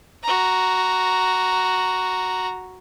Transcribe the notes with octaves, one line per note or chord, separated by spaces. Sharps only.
F#4 A#5